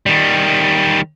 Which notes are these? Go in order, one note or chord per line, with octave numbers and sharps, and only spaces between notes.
D#3 G3